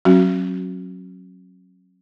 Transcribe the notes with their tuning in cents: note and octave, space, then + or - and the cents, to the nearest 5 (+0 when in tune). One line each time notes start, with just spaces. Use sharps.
F#3 +0 C#4 -40 F#4 +0